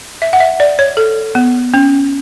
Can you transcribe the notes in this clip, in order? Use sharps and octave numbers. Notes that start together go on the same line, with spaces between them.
E5
F#5
E5
D5
C#5
A4
B3
C#4